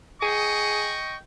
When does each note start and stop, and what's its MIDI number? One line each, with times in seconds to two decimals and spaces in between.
0.22 0.96 68
0.22 1.16 75
0.22 1.16 79
0.22 1.16 85